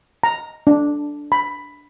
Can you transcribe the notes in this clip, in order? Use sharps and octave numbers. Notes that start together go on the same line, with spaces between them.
A#5
D4
B5